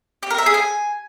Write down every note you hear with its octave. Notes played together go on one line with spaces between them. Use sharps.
G4
A#4
E5
G#4
G#5